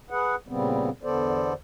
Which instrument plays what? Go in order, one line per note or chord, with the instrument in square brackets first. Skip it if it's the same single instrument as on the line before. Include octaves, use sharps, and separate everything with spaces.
[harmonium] G#4 B4 F#5
A#2 C#3 G3 B3 C4
E2 D3 B3 A4 C5 D5